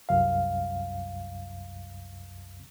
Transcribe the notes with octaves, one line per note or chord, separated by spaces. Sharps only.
C2 F#2 F5